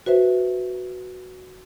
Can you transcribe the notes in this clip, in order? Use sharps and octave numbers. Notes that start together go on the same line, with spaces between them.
F#4 B4 C5 E5